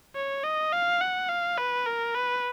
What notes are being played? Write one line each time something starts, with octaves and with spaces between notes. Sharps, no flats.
C#5
D#5
F5
F#5
F5
B4
A#4
B4